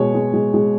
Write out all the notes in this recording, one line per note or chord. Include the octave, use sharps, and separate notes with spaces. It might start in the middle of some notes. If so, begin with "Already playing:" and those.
Already playing: B2 G#3 C#5
G#3
G#3
G#3